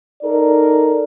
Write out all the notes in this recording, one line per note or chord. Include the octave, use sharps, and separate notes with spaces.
D#4 A4 A#4 D5